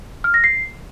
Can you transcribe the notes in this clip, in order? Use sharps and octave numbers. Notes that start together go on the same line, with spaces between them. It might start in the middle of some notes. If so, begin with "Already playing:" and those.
F6
A#6
C7